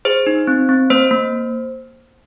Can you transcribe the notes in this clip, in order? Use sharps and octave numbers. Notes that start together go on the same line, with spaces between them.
G#4 C5
D#4
C4
C4
A#3 C5
A#3